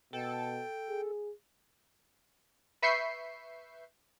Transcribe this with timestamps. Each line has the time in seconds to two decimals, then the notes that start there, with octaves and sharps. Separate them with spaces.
0.13 B2 A4 G5
0.89 G#4
2.82 B4 E5 C#6 G6 C7